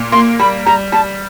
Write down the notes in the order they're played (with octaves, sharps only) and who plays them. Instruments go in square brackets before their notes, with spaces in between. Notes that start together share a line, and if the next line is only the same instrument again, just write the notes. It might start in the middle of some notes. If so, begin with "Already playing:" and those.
Already playing: [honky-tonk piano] A#2
[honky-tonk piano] A#3 [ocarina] C6
[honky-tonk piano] G3 [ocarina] B5
[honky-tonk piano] G3 [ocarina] A#5
[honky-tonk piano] G3 [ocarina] A5